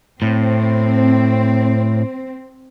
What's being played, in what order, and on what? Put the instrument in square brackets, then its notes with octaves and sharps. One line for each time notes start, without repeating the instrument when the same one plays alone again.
[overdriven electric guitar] A2 [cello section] C4